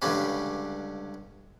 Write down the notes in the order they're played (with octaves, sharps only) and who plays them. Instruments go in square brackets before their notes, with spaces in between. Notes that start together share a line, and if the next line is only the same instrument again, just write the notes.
[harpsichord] C#2 G2 D3 G3 C#4